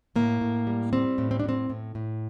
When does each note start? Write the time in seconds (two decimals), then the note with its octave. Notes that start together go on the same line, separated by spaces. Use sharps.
0.16 A2 A#3
0.41 A2
0.67 G3
0.93 G3 C4
1.18 A2
1.31 C4
1.40 D4
1.44 A2 C4
1.70 A2
1.95 A2